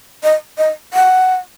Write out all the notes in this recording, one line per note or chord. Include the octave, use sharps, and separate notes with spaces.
D#5
D#5
F#5